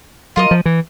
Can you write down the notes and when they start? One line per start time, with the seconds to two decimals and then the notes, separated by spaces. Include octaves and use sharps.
0.36 F#3 F4 A#4 D#5
0.51 F3
0.66 E3